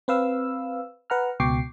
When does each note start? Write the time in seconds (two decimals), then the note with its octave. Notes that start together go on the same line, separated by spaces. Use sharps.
0.08 C4 B4 F5 E6
1.10 B4 F#5 A#5 F6
1.40 C#2 B2 G5 C#6 D6 C7